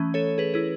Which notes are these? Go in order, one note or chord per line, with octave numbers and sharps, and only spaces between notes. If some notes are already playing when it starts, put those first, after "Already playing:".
Already playing: E3 A3 C#4
A4 C#5
G#4 B4
E4 G#4